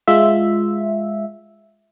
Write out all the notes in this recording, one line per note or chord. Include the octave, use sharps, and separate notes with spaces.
G#3 F4 E5